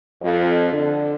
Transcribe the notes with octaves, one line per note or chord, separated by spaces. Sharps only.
F2
D3